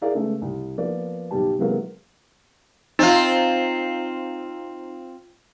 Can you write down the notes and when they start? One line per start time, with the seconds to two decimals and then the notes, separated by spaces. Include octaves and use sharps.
0.02 E4 G#4 A#4 D5 F5
0.14 C#3 G#3 A3 B3
0.41 C2
0.78 F3 A#3 B3 D5
1.31 B1 B2 G3 G4 A5
1.59 C3 E3 F#3 G#3 A#3 B3
2.99 C4 D#4 F4